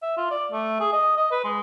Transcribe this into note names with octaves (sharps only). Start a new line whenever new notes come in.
E5
F4
D5
A3
G#4
D#5
D#5
B4
G#3